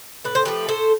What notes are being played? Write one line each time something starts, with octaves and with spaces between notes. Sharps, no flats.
A2 B4
C5
F3 A3 G4 B4
A2 A4 C5